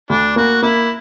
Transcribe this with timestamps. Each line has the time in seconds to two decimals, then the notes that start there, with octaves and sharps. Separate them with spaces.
0.10 D2 D4
0.36 A#3 F#4
0.62 A#3 E4